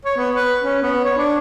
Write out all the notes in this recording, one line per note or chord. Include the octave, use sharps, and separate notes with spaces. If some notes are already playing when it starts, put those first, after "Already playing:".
C#5
B3
B4
C#4
B3
C#5
D4